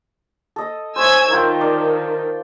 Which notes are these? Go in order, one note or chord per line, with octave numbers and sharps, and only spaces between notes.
A4 D#5
C5 C#5 E5 G#5 E6 G#6
D#3 D#4 F4 G5
D5